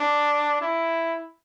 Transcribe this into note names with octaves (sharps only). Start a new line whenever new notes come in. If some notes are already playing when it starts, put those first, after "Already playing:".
Already playing: D4
E4